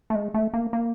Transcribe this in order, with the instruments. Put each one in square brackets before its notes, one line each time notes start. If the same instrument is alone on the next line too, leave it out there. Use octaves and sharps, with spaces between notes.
[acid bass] A3
G#3
A3
A#3
A#3